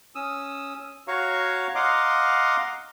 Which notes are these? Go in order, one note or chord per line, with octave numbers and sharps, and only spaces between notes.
C#4 D#6 E6
F#4 C#5 F5 A#5 C#6
D#5 F5 F#5 A#5 C6 D6